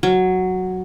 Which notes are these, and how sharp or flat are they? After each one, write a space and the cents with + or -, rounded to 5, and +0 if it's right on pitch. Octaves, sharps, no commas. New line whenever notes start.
F#3 +0